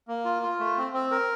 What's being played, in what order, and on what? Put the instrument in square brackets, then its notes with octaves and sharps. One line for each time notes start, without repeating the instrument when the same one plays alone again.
[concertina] A#3
F4
F4
A3
C4
C4
A#4